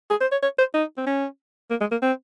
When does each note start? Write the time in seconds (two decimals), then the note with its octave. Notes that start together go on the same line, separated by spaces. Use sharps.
0.10 G#4
0.21 C5
0.32 C#5
0.43 C#5
0.59 C5
0.74 D#4
0.98 C4
1.07 C#4
1.70 A#3
1.81 G#3
1.91 A#3
2.02 C4